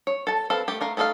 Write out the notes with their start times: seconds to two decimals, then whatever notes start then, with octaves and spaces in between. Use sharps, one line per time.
0.07 C#5
0.27 A4 A5
0.50 C4 A4 B4 F5
0.68 A3 G4
0.81 A3 A#4 F5
0.97 A3 D#4 A4 C5 F5